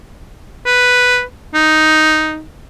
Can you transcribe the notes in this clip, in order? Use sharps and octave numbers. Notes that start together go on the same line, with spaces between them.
B4
D#4